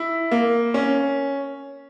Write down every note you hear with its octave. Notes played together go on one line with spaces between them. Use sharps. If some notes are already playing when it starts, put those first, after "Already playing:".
Already playing: E4
A#3
C#4